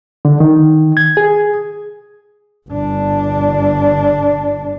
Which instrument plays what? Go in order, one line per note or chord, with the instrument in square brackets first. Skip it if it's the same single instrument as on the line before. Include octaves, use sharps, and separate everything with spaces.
[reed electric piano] D3
D#3
G#6
G#4
[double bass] G1 D4